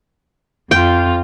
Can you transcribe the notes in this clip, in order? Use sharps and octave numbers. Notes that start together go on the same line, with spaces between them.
F2 F4 G5